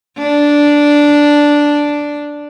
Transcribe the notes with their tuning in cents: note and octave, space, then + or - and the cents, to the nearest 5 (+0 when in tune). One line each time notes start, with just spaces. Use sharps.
D4 -5